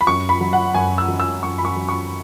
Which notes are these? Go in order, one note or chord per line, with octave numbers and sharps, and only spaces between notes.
B5
F#2 C#6
B5
F#3
F#5
F#2 G#5
E6
F#3
E6
F#2 C#6
B5
C#6
F#3
C#6